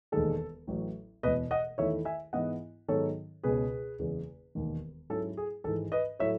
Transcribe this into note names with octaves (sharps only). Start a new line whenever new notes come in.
E1 D#2 D#3 G#3 A4
A1 A2 F#3
E1 E2 B2 B4 D#5
D#5 F#5
E2 D#3 A3 E4 C#5 E5
E5 G#5
G#2 E3 B3 E4 D#5 F#5
G#2 D#3 F#3 B3 D#4 A4 C#5
C#2 B2 G#3 C#4 G#4 B4
F#1 E2 C#3 G#3
E1 D#2 D#3
G#2 F#3 C#4 E4 A4
G#4
G#1 G#2 E3 A4
B4 D#5
A2 F#3 A3 E4 C#5 E5